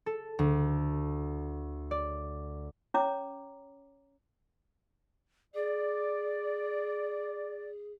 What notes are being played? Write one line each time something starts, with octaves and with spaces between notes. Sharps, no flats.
A4
D2
D5
C#4 C#5 A#5 D6
G#4 D5